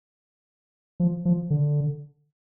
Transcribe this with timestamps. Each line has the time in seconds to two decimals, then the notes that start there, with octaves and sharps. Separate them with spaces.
1.00 F3
1.25 F3
1.50 D3